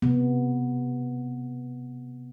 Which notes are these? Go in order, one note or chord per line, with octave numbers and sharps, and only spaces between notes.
C3 B3